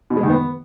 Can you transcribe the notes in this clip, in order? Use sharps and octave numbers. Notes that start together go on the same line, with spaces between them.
B2
G#3
D#3
B3